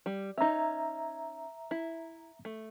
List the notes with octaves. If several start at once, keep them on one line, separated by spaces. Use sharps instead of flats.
G3
C#4 D#4 E5 A#5
E4
A3